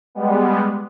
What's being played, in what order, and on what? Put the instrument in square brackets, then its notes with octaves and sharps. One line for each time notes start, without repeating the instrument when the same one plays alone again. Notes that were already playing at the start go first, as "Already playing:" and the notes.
[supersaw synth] G3 G#3 B3